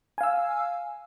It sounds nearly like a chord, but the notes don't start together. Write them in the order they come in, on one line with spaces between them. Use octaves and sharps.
G#5 F5 E6